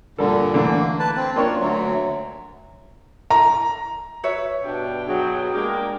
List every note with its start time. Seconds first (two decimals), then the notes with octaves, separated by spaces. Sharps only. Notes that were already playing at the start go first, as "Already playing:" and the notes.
0.18 G2 A#2 D3 A4
0.54 D3 E3 A3 A#3
0.99 B4 A5
1.16 C4
1.36 A#3 D4 F4 C#5
1.59 D2 F#3
3.30 A#5
4.23 B4 C#5 E5
4.63 G2 B2 D4 G5
5.08 F#3 G#4
5.53 G#3 A#3 D4 G4 A#4